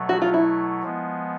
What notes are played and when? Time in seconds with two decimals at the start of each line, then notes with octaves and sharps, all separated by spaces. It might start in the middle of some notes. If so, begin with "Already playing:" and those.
Already playing: B2 F#3 A3
0.09 F#4
0.22 F4
0.34 E4
0.83 F3 G#3 B3